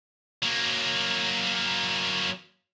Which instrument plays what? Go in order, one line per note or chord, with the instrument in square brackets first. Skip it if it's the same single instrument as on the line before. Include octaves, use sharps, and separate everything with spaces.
[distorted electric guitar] F#3 A#3